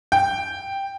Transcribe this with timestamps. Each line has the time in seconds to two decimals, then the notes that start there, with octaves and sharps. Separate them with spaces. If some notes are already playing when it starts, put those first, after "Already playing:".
0.12 G5